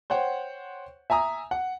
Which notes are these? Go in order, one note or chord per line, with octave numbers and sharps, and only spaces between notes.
C5 C#5 F#5 G5
E5 G#5 A#5 D#6
F#5